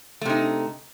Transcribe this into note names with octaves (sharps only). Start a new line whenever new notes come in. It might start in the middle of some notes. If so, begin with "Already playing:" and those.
C3 A3 D#4